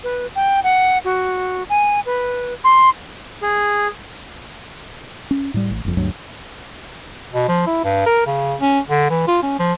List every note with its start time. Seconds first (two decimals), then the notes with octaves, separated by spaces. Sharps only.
0.04 B4
0.35 G5
0.64 F#5
1.05 F#4
1.70 G#5
2.06 B4
2.64 C6
3.42 G#4
5.31 C#4
5.54 A2 G3
5.71 A1
5.85 F#1 F2
5.97 D2 G2 F#3
7.33 B2
7.48 F3
7.67 E4
7.84 G2
8.06 A#4
8.26 C#3
8.61 C#4
8.89 D3
9.10 E3
9.27 F4
9.43 C#4
9.59 F3